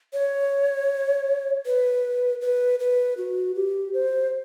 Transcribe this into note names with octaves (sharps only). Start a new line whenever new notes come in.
C#5
B4
B4
B4
F#4
G4
C5